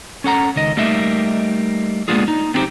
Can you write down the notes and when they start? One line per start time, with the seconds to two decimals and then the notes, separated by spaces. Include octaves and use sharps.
0.24 C#4 A4 F#5 A#5
0.56 C#2 D#3 D#5
0.77 G3 A3 A#3 D#4 D#5 E5
2.08 G#3 A#3 B3 D4 F4 G#4
2.28 D#4
2.54 B3 C4 D#4 G4 C5